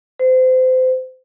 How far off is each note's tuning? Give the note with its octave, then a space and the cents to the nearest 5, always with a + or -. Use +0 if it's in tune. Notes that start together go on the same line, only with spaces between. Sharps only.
C5 -30